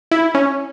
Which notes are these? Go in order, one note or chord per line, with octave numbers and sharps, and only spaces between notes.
E4
C#4